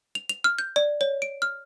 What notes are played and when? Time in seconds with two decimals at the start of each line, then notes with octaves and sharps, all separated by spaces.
0.15 F7
0.29 F7
0.44 F6
0.59 G6
0.76 D5
1.01 C#5
1.22 D7
1.42 F6